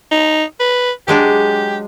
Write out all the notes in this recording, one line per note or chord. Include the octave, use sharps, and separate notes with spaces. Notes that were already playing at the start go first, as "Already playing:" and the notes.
D#4
B4
F#3 G#3 D4 G4